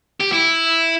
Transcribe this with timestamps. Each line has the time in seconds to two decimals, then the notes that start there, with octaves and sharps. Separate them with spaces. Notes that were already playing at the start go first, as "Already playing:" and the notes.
0.20 G4
0.32 E4